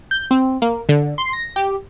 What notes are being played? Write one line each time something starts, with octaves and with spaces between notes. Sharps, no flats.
G6
C4
A#3
D3
C6
A#6
G4